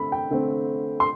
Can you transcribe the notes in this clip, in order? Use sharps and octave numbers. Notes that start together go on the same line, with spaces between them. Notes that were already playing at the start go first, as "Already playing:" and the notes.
Already playing: D3 A3 C4 B5
G5
D3 A3 C4
C6